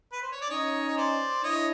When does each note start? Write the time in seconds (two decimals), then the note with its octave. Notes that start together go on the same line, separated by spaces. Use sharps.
0.12 B4
0.22 C5
0.32 C#5
0.41 D5
0.50 C#4 D#4 C#5 D#5
0.88 C#5
0.97 C5 D5
1.43 D4 E4 C#5 D#5